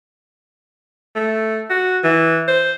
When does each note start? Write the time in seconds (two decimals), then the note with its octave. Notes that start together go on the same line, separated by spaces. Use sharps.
1.16 A3
1.70 F#4
2.04 E3
2.48 C5